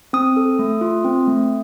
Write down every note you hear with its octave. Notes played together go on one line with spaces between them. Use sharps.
C4 D#6
A4
A3
F4
C4
A3